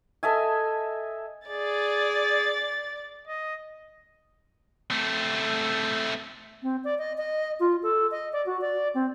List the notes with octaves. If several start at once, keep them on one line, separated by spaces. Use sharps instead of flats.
A4 D#5 E5 G#5
G#4 D5 A6
D#5
A3 C4
C4
D5
D#5
D#5
F4
A4
D#5
D5
F#4
D5
C4